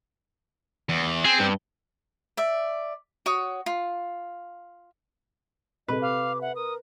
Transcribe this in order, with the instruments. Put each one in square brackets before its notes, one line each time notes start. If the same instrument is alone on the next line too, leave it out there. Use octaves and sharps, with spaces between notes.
[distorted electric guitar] E2
[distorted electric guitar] C4 [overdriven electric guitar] G#4
[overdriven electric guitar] G2
[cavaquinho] D5 E5
F#4 C#5 D#6
F4
[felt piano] C3 A4 [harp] B4 [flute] D#5
[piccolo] F5 [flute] D6
[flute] E5 [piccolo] F#5
[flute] A#4 [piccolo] D#6